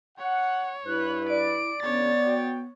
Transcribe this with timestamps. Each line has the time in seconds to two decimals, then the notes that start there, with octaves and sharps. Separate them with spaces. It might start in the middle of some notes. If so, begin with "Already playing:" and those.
0.18 C#5 F#5
0.86 G2 E4 B4 F#6
1.30 D5 D7
1.83 E2 C#3 B3 D4 C#5 A6
2.26 F#4 G5